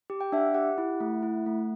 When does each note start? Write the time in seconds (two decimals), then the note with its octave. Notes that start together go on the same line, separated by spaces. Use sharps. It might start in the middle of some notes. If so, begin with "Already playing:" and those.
0.10 G4
0.21 G5
0.32 D4 E5
0.37 F#5
0.54 G4 F#5
0.78 E4
1.00 A3
1.22 E4
1.46 A3